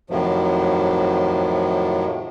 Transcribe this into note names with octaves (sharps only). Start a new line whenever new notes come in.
F2 A2 C3 D#3 F3 F#3